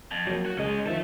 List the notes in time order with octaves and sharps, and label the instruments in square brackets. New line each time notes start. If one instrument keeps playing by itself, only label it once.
[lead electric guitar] F2
[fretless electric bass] F#3 G#3 A#3
[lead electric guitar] F#4
[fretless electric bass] C#2 G#3 [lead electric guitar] C#4 D#5
[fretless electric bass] D#3 F3 [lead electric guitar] A4 E5